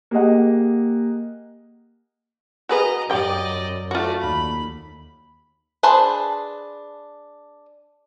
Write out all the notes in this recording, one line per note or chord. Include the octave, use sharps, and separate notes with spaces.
A#3 G4 G#4 D#5 F#5
F#4 G#4 B4 D#5 A#5
F#2 G4 D5 D#5 G5
A3 F4 F#4 D5
D#2 B5
D4 G#4 B4 C5 A5